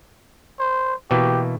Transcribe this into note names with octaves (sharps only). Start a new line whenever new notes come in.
C5
B2 E3 A#3 G4